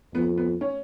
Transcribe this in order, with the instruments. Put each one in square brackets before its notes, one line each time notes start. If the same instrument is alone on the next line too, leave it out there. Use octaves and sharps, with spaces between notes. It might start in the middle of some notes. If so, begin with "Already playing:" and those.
[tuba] F2 [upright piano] B3
[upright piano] B3
C#4